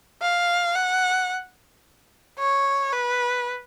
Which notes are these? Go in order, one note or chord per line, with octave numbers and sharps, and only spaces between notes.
F5
F#5
C#5
B4